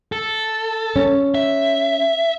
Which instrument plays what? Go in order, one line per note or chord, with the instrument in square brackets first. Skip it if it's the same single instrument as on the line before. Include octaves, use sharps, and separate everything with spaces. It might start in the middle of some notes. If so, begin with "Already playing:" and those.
[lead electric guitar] A4
[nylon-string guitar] C#4
[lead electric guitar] E5